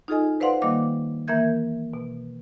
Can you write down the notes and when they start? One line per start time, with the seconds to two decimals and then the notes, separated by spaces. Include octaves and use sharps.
0.08 D#4 F4 G#4 A4 D#5 G#5
0.40 B4 C5 D5 F5 F#5 C6
0.62 D#3 G3 A#3 D#5 F5 D6
1.28 E3 A#3 A#4 E5 G6 G#6
1.94 B2